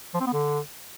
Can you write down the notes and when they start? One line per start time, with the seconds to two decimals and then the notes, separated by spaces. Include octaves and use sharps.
0.14 F3
0.20 C4
0.27 B3
0.33 D3